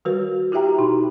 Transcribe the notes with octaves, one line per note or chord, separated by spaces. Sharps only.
D#3 G3 F#4 A#4 B4
E4 F#4 G4 E5 G5 A#5
B2 D#4 B5